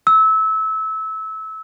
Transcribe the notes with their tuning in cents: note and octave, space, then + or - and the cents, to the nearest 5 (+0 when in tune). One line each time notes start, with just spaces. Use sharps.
E6 -25